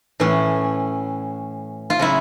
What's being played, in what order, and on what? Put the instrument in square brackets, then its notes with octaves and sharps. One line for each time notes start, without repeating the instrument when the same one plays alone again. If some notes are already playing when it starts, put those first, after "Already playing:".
[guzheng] A2 E3 C#4
F4
C#3 F#3 E4